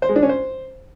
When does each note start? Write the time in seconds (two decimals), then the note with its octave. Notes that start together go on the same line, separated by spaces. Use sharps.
0.02 C5
0.09 G#3
0.16 D4
0.22 C#4
0.29 C5